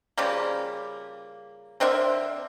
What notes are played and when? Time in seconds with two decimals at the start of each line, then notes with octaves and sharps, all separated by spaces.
0.18 C#3 F3 G3 A#3
1.80 D3 C4 A#4 E5